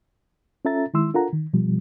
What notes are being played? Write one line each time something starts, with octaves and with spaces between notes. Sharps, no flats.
C#4 F4 A4 E5 A#5 A6
D#3 G#3 E4 C6 E6
D4 F4 A4 A#4 F#5 A#5
D#3
B2 F3 G3